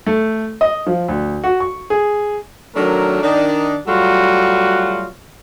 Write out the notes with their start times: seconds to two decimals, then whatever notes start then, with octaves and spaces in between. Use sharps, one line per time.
0.06 A3
0.61 D#5
0.86 F3
1.08 D2
1.44 F#4
1.60 C#6
1.90 G#4
2.75 D#3 F#3 A3 D4 A#4
3.22 D#3 D4 D#4
3.88 F#3 G3 A3 F4 F#4